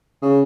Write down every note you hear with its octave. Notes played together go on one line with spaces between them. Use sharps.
C#3